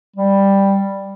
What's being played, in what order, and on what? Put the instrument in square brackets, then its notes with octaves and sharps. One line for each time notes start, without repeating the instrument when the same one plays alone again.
[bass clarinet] G3